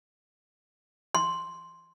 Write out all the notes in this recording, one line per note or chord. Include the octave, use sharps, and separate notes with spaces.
C6